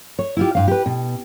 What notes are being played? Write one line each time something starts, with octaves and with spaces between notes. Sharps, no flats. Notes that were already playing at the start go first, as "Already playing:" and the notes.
C#5
E4 F4 G4
G2 F5
G4 B4
B2